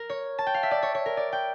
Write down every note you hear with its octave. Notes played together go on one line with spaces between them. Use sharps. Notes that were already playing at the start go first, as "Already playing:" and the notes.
Already playing: A#4
C#5
A5
G5
F5
E5
D5
C#5
C#5
A#4
D5
G5